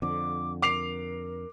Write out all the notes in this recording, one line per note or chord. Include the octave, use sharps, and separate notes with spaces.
F2 D3 D6
A#4 D6 C7 F7